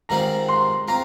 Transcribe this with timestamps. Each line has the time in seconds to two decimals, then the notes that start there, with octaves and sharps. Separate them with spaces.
0.09 G#2 D#3 G3 C4 F4 A#5
0.49 C6
0.88 C4 F4 A#5